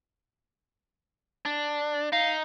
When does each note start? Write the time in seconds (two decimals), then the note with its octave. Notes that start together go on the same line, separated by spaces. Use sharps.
1.45 D4
2.13 D#4 F5